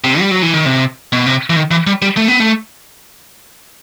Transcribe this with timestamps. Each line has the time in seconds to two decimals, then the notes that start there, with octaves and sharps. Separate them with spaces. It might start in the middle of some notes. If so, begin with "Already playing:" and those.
0.04 C3
0.20 G3
0.31 F#3
0.42 E3
0.54 D#3
0.66 C3
1.13 B2
1.26 C3
1.50 E3
1.56 D#3
1.71 E3
1.87 G3
2.02 G3
2.17 A3
2.28 B3
2.40 A3